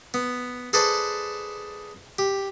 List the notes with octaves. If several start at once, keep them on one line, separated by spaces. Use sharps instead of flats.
B3
G#4 A4 B4 C5 D5 A5
G4